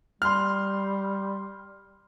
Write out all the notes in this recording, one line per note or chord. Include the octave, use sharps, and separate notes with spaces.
G3 C6 F6